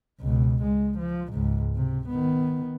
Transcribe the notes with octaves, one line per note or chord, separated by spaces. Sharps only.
C#2 B2
G#3
F3
C#2 G#2
C3
D#3 B3